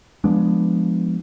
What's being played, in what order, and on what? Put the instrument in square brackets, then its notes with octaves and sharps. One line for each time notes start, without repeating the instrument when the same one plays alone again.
[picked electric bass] F3 G#3 B3 D4